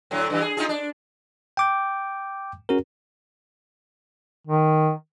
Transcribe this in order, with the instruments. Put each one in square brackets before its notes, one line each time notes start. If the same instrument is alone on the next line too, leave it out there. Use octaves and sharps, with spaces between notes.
[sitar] A2 D3 F#3
G2 E3 G4
G#4
D#4 F4 G#4
D4
[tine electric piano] G5 D6 G6
C#4 F#4 G#4 A#4
[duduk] D#3